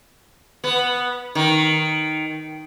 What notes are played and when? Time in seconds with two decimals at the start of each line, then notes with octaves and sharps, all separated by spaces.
0.64 B3
1.35 D#3